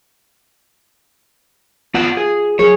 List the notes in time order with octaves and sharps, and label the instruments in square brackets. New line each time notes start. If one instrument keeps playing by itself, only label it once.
[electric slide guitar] B3 D5 F#5 [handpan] F4
[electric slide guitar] G#4
[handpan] F#3 G#4 A#4 [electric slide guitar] C#5